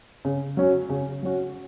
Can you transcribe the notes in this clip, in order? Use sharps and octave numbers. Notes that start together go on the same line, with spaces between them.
C#3
F#3 C#4 F#4
C#3
F#3 C#4 F#4